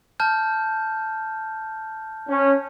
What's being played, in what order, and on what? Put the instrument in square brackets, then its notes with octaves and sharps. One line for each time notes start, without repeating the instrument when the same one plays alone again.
[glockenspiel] A5 F6 G6
[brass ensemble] C#4